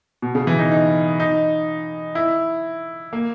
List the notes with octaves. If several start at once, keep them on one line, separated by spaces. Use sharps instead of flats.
B2
C#3
E3
D#4
D#4
D#4
E4
A#3